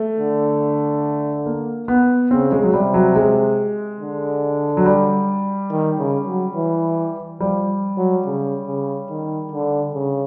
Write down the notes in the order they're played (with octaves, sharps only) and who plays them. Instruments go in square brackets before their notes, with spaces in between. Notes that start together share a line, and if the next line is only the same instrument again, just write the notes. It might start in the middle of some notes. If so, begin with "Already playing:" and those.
Already playing: [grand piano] A3
[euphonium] D3
[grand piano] A#3
B3
[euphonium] C#3 [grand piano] C4
[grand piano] G#3
F#3
[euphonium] C3 [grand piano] G3
[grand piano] F#3
G#3
[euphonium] D3
[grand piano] F#3
G3
[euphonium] D#3
C#3
F#3
E3
[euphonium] F3 [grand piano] G3
[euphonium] F#3
C#3
C#3
D#3
D3
C#3